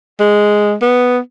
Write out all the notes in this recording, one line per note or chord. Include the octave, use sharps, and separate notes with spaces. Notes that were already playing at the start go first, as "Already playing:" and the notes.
G#3
B3